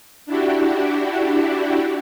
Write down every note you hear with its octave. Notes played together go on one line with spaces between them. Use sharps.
D4 E4 F#4 G4